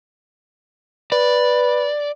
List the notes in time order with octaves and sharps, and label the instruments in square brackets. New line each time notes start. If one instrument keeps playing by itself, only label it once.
[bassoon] B4 [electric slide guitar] D5